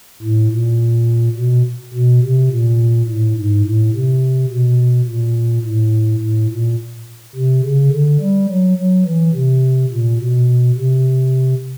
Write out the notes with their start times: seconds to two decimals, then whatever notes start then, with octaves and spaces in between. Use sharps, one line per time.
0.22 A2
0.52 A#2
1.36 B2
1.94 B2
2.23 C3
2.51 A#2
3.08 A2
3.36 G#2
3.64 A2
3.94 C3
4.50 B2
5.07 A#2
5.64 A2
6.21 A2
6.50 A#2
7.35 C3
7.64 C#3
7.92 D3
8.20 G3
8.49 F#3
8.78 F#3
9.06 E3
9.34 C3
9.92 A#2
10.20 B2
10.77 C3